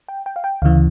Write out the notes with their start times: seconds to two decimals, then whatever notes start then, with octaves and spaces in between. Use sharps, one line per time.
0.09 G5
0.26 G5
0.36 F5
0.44 G5
0.62 D2 C#3 E3 F5